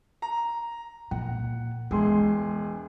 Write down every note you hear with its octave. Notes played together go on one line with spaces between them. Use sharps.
A#5
A#2 F#5
E1 G#3 G#4 C6